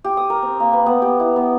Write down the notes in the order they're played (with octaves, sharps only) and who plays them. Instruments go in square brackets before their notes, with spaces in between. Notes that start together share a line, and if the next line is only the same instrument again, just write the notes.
[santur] G4
D#6
A#4
C4
A#3
B4
B3
G4
E4
B3